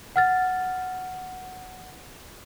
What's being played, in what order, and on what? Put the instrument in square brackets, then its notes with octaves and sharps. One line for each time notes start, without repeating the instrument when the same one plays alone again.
[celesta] F#5 F6 A6